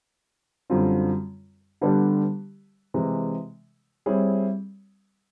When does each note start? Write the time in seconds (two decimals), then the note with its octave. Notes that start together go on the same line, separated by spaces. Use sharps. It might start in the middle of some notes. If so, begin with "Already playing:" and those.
0.70 F#2 D3 G3 C4 F4
1.81 D3 G3 B3 D4 G4
2.94 C3 E3 G#3
4.06 G3 C4 E4 G#4 C#5